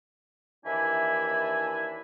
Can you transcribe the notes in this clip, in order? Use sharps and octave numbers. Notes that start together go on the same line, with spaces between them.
D#2 E3 D4 E4 G#5 B5